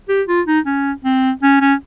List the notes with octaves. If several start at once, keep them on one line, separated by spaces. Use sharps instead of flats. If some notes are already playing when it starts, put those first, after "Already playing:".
G4
F4
D#4
C#4
C4
C#4
C#4